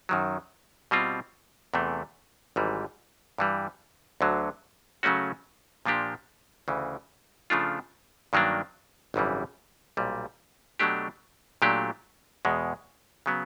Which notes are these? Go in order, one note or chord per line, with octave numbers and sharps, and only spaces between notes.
F#2 D#3 F#3
B2 G3 C4 F4
E2 C3 E3 A3
G#1 G#2 E3 G3
G2 E3 G3
D2 D3 F#3
C#3 F#3 A3 C#4 F#4
A#2 F3 A#3 D4 G4
D2 C#3 E3
C#3 F3 A3 D4 F4
G2 D#3 F#3 A#3 D4
G#1 F#2 C#3 E3 G3
B1 A#2 G3
B2 F#3 A3 D4 G4
A#2 F#3 A3 D4 G4
E2 B2 G#3
C#3 F#3 B3